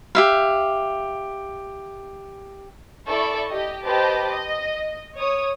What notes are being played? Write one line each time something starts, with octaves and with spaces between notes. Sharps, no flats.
G4 E5 F5
E4 A4 D5 C#6
G4 D#5
G4 B4 C5 D#5 A5 D6
D#5
C#5 D#6